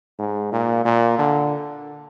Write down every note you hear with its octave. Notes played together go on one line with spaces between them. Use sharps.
G#2
A#2
A#2
D3